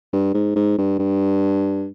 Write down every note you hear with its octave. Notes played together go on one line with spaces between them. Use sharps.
G2
G#2
G#2
G2
G2